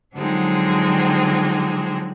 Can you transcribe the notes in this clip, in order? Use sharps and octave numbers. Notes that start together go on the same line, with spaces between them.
D3 F3 F#3 G#3 C4 D#4